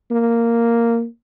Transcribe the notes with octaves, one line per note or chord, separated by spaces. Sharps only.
A#3